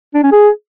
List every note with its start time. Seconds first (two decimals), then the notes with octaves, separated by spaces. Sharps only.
0.14 D4
0.23 C#4
0.32 G#4